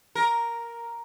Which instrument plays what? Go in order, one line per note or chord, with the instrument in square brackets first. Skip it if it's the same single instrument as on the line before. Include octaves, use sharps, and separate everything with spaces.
[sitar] A#4